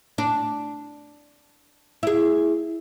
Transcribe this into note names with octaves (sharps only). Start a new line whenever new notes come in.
D4
E4 G#4